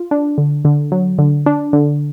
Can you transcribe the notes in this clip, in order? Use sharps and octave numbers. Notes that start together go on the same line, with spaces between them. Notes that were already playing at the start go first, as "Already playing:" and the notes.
Already playing: F4
D4
D3
D3
F#3
D3
D4
D3